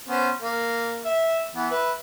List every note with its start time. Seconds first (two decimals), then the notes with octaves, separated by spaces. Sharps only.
0.08 B3 C#4 C5
0.42 A#3
1.05 E5
1.55 E3 B3
1.71 B4 E5